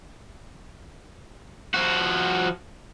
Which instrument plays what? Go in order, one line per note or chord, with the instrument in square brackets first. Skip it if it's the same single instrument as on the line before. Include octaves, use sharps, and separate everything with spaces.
[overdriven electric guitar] F3 F#4